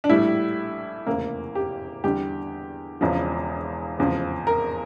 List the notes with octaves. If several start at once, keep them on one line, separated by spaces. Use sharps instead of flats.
D4
A#1 A2 G3 E4
F1 E2 C#3 A#3
G4
E2 D3 G3 G4
E1 E2 C#3 F3
F1 E2 C#3 F3
A#4